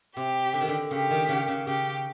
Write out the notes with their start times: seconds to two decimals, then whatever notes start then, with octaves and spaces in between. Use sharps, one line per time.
0.16 C3 G4
0.53 D3
0.61 D#3
0.68 D3
0.91 C#3 G4
1.11 D#3
1.29 C#3
1.48 C#3
1.67 C#3 G4